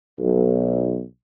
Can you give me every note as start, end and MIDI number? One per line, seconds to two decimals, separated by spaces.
0.20 1.02 35